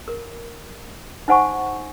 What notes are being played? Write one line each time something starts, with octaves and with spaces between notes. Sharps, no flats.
A#4
D#4 C5 F#5 G#5 B5 C#6